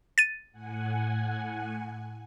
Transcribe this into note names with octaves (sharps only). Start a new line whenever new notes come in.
A6 D#7
A2 F#5 G#5